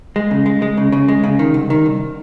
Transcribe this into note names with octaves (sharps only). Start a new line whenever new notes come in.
G#3
C#3
G#3
G#3
C#3
C#3
G#3
C#3
D#3
C2
D#3
C2